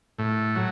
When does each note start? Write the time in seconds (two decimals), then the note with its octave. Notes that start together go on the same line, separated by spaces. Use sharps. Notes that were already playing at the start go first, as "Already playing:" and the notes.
0.19 A2
0.56 F#3